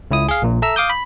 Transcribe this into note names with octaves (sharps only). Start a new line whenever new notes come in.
C#2 E4 D#6
G#4 F5
A#1 A#2
A4 E5 A#5 E6
F5 D6 D#6 G6
B5